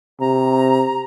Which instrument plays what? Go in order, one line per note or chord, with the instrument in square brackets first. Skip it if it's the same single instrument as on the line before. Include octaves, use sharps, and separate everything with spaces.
[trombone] C3 [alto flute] A#5